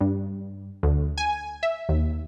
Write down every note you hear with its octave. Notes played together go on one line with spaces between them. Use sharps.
G2
D2
G#5
E5
D#2